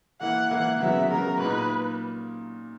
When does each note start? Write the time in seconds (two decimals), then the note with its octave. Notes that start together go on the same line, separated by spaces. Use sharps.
0.21 E3 A#3 E4 F#5
0.51 E3 A#3 E4 F#5
0.80 C#3 F#3 B3 E5
1.11 C#3 F#3 B3 A#4
1.40 A#2 A#3 D#4 B4